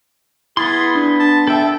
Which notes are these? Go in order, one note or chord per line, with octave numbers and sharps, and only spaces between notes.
B3 E4 G#4 C6 A6
D4
A5
A4 E5 G5